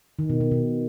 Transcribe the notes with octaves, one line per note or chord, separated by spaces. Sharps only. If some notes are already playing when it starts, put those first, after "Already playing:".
D#3
B2
B2
B2